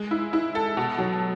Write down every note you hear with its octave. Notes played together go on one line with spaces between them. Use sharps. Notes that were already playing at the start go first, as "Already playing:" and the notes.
Already playing: G#3
E4
E4
A4
B2
F#3